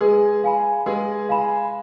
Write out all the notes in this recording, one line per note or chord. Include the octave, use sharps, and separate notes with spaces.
G#3 G#4 B4
F5 G#5 B5
G#3 G#4 B4
F5 G#5 B5